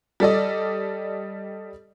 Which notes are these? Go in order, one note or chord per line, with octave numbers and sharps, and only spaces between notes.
G3 A4 D5 D#5